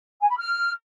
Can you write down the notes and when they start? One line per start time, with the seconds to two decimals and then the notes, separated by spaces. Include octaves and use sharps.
0.21 G#5
0.29 B5
0.37 F6